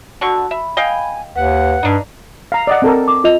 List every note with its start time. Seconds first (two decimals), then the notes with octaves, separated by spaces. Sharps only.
0.21 B2 D3 F#4 A5 C#6 E6
0.51 E5 B5
0.77 D#5 F5 G5 G#5
1.36 D#2 B4 F#5
1.83 G2 D4 D#4
2.52 F5 A#5
2.67 D5 D#5 F#5
2.82 C4 A4 A#4
3.08 D6
3.24 F4 D#5 F7